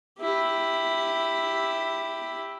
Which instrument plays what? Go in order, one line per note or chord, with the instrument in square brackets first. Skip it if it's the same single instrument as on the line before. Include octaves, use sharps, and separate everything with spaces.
[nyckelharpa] E4 G4